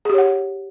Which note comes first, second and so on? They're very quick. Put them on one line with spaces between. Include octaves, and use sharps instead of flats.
G#4 G4 C#5 F#5